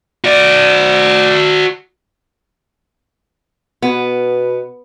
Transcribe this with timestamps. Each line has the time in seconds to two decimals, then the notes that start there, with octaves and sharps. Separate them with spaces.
0.24 F#4 D5
3.82 B2 B3